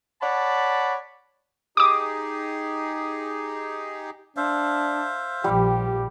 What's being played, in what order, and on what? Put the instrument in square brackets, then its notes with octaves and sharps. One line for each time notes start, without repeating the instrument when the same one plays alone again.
[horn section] C#5 D5 F#5 A5 B5
[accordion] D#4 G4 G#4 [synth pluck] D6 D#6
[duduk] D4 [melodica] C5 E5 F5
[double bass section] A#1 F3 [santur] G3 [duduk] G4